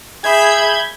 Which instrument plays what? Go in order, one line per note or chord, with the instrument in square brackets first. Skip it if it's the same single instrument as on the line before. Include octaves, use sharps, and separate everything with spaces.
[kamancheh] G#4 E5 [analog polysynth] B5 G6 G#6